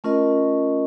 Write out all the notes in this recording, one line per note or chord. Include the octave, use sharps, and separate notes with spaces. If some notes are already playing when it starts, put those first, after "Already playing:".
A3 C#4 F4 A#4 D#5